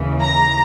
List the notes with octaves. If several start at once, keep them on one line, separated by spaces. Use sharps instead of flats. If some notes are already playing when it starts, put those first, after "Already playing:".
Already playing: D#2 C#3 E3
A#5